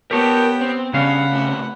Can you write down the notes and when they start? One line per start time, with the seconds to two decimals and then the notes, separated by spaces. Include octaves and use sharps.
0.11 B3 G4 A#4 C#5 G5 A5
0.61 C4
0.93 G2 C#3 C#4 F5 F#5 B5
1.33 A2 C3